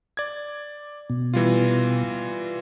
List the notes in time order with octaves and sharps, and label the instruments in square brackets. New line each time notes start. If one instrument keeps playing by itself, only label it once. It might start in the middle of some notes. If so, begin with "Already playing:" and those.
[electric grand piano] D5 G#6
[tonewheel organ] B2
[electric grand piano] E3 G3 F4